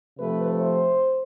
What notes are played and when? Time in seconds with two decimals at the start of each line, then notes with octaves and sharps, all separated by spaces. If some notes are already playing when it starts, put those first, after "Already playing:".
0.18 C3 F3 A3 B4
0.60 C5